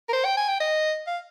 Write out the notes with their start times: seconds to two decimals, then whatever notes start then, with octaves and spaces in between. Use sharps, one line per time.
0.09 A#4
0.13 C5
0.25 G5
0.37 G#5
0.49 G5
0.60 D#5
1.07 F5